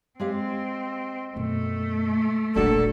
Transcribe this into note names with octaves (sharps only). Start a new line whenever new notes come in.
G#3 C4 G4 F5
F#2 B2 A3
E1 A#1 A#3 D4 F#4 A4